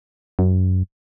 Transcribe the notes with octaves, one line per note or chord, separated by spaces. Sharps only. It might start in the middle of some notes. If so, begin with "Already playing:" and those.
F#2